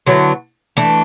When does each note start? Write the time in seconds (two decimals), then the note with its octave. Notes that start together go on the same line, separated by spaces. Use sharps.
0.07 D3 F#3 B3 E4
0.77 E3 A3 D4